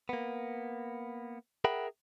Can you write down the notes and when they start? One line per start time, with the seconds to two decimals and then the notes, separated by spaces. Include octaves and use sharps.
0.09 A#3 B3
1.64 G#4 A#4 E5 F#5 G5 B5